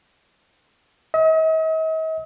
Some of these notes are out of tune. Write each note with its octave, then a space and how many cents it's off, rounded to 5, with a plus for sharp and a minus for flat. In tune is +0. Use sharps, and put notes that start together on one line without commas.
D#5 +45